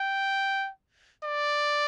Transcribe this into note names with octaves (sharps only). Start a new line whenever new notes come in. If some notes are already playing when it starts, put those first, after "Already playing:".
Already playing: G5
D5